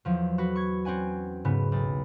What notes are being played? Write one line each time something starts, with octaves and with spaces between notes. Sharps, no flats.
E2 F3 F#3
F#4 B4
C#6 G#6
C4 C#4 F#5 G#5
G#2 C#3 B3
B1 A6